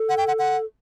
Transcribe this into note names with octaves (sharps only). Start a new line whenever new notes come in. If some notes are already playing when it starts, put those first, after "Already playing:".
Already playing: A4
F#5
G5
F#5
F#5